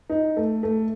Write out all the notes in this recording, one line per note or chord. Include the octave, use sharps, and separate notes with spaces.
D#4
A3
A3